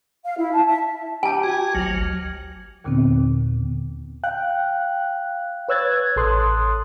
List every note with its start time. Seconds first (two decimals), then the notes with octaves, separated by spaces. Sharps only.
0.25 F5
0.38 E4
0.54 A5
0.68 E5
1.23 G4 G#5 A5
1.44 F#4 G#6
1.75 G#1 D2 F#3 F6
2.84 D#2 A#2 D3 B3 C4
4.24 F5 G5 F#6
5.68 B4 C#5 E6 F#6 G#6 A6
6.16 A1 A4 C6 D#6 F#6